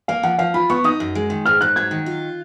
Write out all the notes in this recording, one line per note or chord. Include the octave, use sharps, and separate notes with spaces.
A#3 F5
F3 F#5
F3 F5
F4 B5
B3 C#6
D#4 D#6
F#2
G#3
D#3
G#2 F6
G#2 F#6
F#3 G#6
D#3
F4